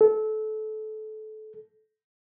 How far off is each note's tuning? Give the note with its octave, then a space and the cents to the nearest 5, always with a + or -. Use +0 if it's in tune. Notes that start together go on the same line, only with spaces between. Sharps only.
A4 -25